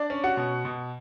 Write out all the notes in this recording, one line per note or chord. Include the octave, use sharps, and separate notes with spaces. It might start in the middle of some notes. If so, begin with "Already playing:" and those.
Already playing: D4 D5
C#4
F#4 F#5
B2
B2